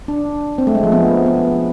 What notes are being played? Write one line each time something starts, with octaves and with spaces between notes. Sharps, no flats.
D4
C4
A3
G#3
F3
B3
B3